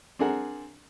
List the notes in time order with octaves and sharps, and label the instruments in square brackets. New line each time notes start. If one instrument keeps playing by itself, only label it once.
[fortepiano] C4 D4 G#4 A#4 F#5